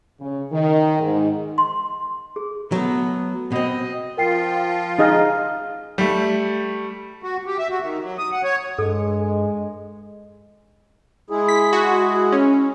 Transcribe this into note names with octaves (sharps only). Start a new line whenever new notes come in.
C#3
D#3
G#2
C6
G#4
F#3 A3 B3
B2 C4 D#5
F3 F4 A#4 G5 C7
D#4 G#4 D#5 F5 F6
G3 A3
F#4
G4
E5
F#4
D#3
F#3
D#6
F#5
C#5
G2 G#3 A4
G#3 E4 G#4
B6
F#4
C#4